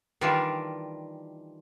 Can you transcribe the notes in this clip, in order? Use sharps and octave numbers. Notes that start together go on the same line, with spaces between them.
D#3 E3 G3 D4 F4